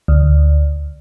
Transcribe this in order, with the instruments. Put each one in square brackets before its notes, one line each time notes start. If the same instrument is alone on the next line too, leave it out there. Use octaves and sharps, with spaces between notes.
[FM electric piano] D2